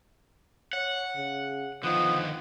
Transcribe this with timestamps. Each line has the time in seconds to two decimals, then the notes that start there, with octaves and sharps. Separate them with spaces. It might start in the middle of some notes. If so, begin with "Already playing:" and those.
0.73 C#5 F#5
1.16 C#3
1.83 D3 D#3 F3 B3 F#5